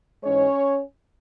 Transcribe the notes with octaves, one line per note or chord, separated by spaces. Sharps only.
G#2 E3 G#3 C#4 C#5